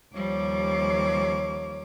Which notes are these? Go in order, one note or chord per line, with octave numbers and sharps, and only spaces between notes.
D#2 F3 G3 C#5 D6